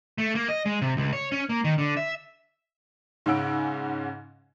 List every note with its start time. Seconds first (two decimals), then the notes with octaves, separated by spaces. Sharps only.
0.18 A3
0.35 A#3
0.49 D#5
0.66 G#3
0.82 C3
0.97 C#2
1.13 C#5
1.32 C#4
1.49 A#3
1.64 D#3
1.78 D3
1.97 E5
3.26 G#2 C#3 C#4 F#5 E6 D7